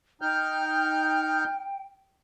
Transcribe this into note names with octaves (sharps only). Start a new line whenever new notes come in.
D#4 G5 F6 G6